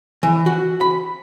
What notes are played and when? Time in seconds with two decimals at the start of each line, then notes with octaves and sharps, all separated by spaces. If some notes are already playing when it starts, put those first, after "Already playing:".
0.23 E3
0.46 F#4
0.81 B5